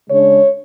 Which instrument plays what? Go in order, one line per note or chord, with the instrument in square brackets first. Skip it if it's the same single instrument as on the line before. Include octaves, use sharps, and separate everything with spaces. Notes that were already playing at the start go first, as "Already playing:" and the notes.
[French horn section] C#3 G#3 D4 C#5